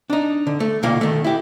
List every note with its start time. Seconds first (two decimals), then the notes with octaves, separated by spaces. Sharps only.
0.10 D4 D#4
0.47 D3
0.60 A3
0.83 B2 D3 A#3 F4 F5
1.01 D#3 A3
1.24 E4 G4